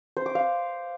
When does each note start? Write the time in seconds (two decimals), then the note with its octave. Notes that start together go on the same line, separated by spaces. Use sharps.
0.17 C5
0.26 D6
0.35 F5